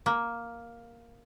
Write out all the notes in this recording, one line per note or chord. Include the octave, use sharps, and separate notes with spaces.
A#3